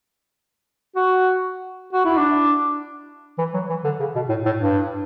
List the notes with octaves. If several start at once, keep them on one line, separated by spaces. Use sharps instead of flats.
F#4
F#4
E4
D4
E3
F#3
E3
D3
C#3
B2
A2
A2
G2